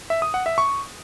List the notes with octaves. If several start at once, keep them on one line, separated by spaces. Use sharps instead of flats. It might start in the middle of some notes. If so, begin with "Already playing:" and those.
E5
D#6
F#5
E5
C#6